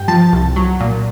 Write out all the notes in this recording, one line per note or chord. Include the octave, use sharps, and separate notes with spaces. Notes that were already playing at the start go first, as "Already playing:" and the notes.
Already playing: G2 G5
F3 A5
C2
F#3
A#2